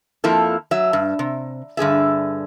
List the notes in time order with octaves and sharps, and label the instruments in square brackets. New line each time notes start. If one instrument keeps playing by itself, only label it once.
[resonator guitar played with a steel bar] F2 F3 A#3 E4 A4
F#3 E5
G2
C3
G2 D3 G#4 E5